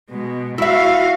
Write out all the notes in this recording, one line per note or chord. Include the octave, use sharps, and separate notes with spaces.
B2 G#3
E4 F#4 E5 F5